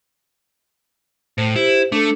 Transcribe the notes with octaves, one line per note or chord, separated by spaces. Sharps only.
A2 C5
E4 G4 C5
A3 D4 A4